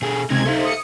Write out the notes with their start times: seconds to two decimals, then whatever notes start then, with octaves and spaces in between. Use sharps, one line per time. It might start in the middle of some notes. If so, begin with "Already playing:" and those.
0.02 B2 G#4 A4
0.30 C#2 C3 G#3 C4 D#4 G#6
0.45 D#4 A4 C5 E5 F5
0.65 D#6 C#7